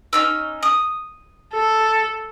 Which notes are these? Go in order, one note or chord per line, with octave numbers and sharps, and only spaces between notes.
C#4 D#4 E6
D#6
A4